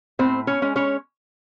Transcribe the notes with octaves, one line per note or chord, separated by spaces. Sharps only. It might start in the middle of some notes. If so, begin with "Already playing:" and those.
A2 C4 C5
C#4 C#5
G#3 C#4
C#4 C#5